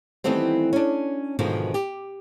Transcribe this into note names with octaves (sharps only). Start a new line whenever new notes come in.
D#3 E3 G3 A3 B3 C4
C#4 D4
G#2 B2 D3 D#3 F3 G#3
G4